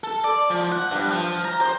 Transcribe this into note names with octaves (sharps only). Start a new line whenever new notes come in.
A4
D5
F3
F#5
G2
F3
A#5
C5